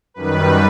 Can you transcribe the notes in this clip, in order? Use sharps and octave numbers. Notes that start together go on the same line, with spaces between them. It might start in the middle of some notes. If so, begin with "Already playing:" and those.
F#2 D#3 G3 B4